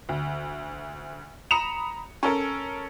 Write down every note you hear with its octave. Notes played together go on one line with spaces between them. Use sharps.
D2
A#5 B5 D#6 C#7 E7 F7
C#4 A4 A#4